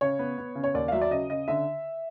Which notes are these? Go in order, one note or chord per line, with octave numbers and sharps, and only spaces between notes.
C#3 C#5
B3
B3
C#3
C#5
D#2 D5
F5
F#3 E5
D5
C#3 D#5
C#3 D#5
D3 E5